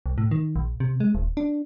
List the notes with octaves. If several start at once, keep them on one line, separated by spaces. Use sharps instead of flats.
C2
A2
D#3
A#1
C3
G#3
D#1
D4